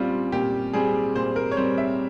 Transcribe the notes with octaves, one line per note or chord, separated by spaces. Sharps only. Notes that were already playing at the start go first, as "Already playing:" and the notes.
Already playing: A#2 G3 C4 C#4 F4
A#2 G4
G3 C4 G#4
A#2 C5
A#4
C#5
G3 C4 C5
E5